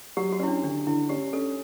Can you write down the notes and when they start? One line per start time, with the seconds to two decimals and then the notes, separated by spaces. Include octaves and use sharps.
0.17 F#3 G4
0.32 F#4
0.39 C#4 E4
0.48 D4
0.63 D3 D4
0.87 D3 E4
1.09 C#4 G4
1.33 C#4 A4